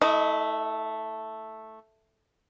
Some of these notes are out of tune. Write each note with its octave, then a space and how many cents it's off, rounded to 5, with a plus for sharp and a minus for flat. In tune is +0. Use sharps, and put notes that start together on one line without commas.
A3 +0 E4 -40 D#5 -5